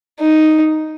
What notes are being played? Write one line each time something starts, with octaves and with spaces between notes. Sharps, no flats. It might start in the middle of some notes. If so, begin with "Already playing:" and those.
D#4